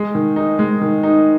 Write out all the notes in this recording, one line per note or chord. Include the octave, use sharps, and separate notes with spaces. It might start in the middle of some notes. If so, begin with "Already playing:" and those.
Already playing: G#3
D#3
D#4
G#3
D#3
D#4